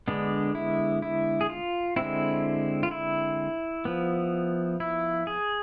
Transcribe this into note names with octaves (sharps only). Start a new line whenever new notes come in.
D3 G#3 B3 D4
E4
E4
G#4
F4
D3 G#3 C4 E4
F4
E4
F3 B3
E4
G#4